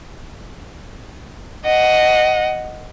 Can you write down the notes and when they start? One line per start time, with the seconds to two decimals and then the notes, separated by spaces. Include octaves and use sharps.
1.65 D#5 F#5